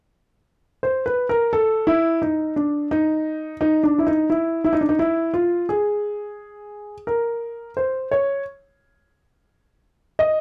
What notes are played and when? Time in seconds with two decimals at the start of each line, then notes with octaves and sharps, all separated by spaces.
0.83 C5
1.06 B4
1.29 A#4
1.53 A4
1.87 E4
2.22 D#4
2.56 D4
2.91 D#4
3.61 D#4
3.83 D4
3.98 E4
4.07 D#4
4.30 E4
4.64 E4
4.73 D#4
4.81 D4
4.89 D#4
4.99 E4
5.34 F4
5.69 G#4
7.07 A#4
7.77 C5
8.11 C#5
10.19 D#5